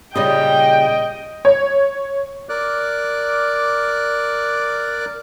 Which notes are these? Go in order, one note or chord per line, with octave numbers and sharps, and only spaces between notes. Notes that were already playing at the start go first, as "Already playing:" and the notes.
A#2 C#3 G3 D#5 G5
C#5
A#4 D5 D6 F#6